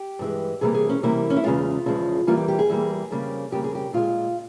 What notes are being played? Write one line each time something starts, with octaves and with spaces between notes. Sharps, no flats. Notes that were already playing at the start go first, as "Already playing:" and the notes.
Already playing: G4
G2 E3 G#3
C3 E3 G3 A#3 G#4
G#4
C#4
C3 E3 G3 A#3 E4
C#4
E4
E2 C#3 F3 G#3 F4
E2 C#3 F3 G#3
E2 E3 G3 A#3 F4
G4
G4
G#4
E2 E3 G3 A#3
F2 C#3 G3 A#3
F2 C#3 G3 A#3 G4
G#4
G4
A#2 G#3 F4